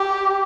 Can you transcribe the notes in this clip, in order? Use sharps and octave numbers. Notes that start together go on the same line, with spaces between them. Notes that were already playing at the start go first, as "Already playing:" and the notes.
Already playing: G4